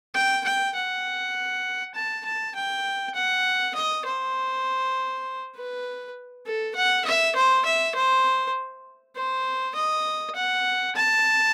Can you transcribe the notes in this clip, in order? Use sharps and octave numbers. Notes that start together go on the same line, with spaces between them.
G5
G5
F#5
A5
A5
G5
F#5
D#5
C5
B4
A4
F#5
E5
C5
E5
C5
C5
D#5
F#5
A5